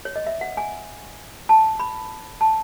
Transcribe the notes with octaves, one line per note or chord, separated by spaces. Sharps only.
C#5
D#5
E5
F#5
G#5
A5
B5
A5